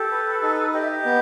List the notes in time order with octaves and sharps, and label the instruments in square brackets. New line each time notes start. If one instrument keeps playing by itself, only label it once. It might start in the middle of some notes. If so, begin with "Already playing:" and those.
Already playing: [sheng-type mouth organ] G4 [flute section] A4
[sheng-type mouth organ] B4
D#4
[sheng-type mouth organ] G4 [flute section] D#5
[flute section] E5
D#5
[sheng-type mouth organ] B3